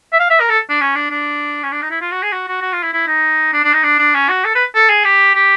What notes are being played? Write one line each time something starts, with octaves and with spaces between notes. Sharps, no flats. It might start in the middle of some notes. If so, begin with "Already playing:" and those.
E5
F5
E5
A#4
A4
D4
C#4
D4
D4
C#4
D4
D#4
E4
F4
F#4
G#4
F#4
F#4
F#4
F4
E4
E4
D#4
D4
D4
D#4
D4
D4
C#4
F#4
A4
B4
A4
G#4
G4
G4